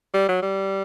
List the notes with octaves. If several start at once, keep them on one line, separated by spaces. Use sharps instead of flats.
G3
F#3
G3